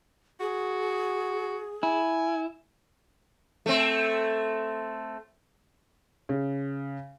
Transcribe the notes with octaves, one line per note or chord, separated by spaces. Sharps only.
F#4 G#4
E4 G#5
A3 C4
C#3